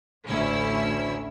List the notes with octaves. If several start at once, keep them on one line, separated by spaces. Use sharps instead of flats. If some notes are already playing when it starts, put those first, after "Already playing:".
A1 D2 C#4 E4 E6